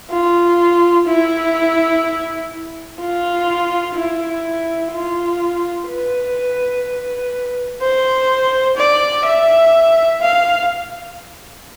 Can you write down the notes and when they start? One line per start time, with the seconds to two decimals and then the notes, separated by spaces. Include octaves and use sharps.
0.10 F4
1.07 E4
3.00 F4
3.96 E4
4.92 F4
5.88 B4
7.81 C5
8.77 D5
9.25 E5
10.22 F5